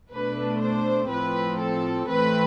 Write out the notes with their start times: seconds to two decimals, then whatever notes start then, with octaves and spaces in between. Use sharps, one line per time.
0.11 B2 A3 D4 B4
0.61 C5
1.10 A2 F3 C4 B4
1.59 A4
2.09 A2 E3 A3 C4 B4